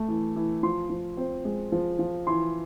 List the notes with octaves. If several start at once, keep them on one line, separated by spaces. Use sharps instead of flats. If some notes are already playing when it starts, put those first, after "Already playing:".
Already playing: A3
E3
E3
F3 C6
F3
C4
G#3
F3
F3
E3 C6